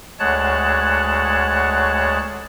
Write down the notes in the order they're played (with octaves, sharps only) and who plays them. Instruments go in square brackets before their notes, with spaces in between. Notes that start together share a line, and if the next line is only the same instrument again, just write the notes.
[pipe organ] D2 G#3 C#5 F#5 A5 F#6